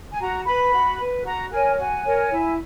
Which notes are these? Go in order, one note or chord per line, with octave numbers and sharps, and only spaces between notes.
G#5
F#4 A#5
B4 B5
F#4
B4
F#4 A#5
A#4 C#5 G#5
F#4 G#5
A#4 C#5
E4